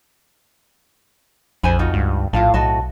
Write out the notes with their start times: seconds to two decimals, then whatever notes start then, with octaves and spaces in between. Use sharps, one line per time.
1.63 A#1 F2 C5 G#5 B5
1.79 D#4 F4 F#4
1.94 C#2 G2
2.33 A#1 A2 F4 F5 A5
2.54 B1 F#4 D#5 A5